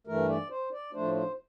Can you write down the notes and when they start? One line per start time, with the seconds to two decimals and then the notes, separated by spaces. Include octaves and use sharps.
0.07 G2 E3 A3 A#4
0.29 D5
0.50 C5
0.72 D5
0.93 A2 F3 A3 D4 C5
1.15 C5